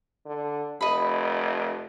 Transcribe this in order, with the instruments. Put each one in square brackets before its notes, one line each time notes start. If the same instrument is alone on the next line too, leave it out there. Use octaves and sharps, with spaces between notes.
[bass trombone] D3
[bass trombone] F1 [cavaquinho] D#5 B5